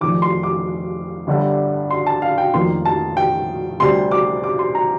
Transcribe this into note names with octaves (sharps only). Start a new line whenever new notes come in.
F1 F2 D#3 D6
C6
D6
G1 G2 D3 G3
C6
A5
F5
G5
F1 F2 D#3 A#3 C6
A5
G5
D2 C3 G3 C6
D6
D6
C6
A#5